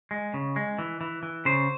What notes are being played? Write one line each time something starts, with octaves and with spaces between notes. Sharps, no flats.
G#3
C#3
G#3
E3
E3
E3
C#3 C5